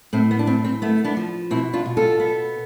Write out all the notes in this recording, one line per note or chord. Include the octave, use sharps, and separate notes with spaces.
A2 C4
B3
D4
A2 C4
C4
A3 B3
B3 D4
F3
B2 C4 E4
D4 F4
B2
F4 A4
B3